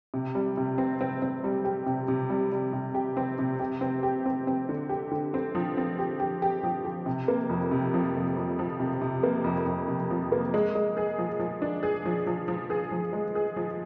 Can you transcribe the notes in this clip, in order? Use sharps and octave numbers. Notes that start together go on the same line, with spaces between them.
C3
G3
C3
C4
C4
C4
G3
G4
C3
C3
G3
G3
C3
G4
C4
C3
G4
C4
G4
C4
C4
D3
G4
D3
C4
F3
C4
G4
G4
G4
F3
G4
C3
A#3
F2
C3
F3
F2
F2
F3
C3
C3
A#3
F2
F2
C3
F3
A#3
G#3
G#3
G#4
F3
F3
D4
G#4
F3
F3
F3
G#4
F3
G#3
G#4
F3